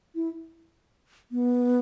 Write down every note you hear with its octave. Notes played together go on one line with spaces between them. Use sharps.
E4
B3